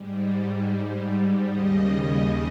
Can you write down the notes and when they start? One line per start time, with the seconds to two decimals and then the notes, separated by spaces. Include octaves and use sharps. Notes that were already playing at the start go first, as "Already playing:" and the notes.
Already playing: G#2 G3
1.49 D#2 C#3 G3 D#5